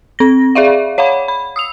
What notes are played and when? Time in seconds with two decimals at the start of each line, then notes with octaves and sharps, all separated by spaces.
0.19 C4 A#6
0.55 G#4 D5 E5 F5
0.98 C#5 F5 F#5 B5
1.28 B5
1.56 D#6 E6 F7